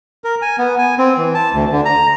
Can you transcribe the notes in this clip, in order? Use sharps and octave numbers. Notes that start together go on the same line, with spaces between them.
A#4
G#5
B3
G#5
C4
E3
A5
D2
D3
A#5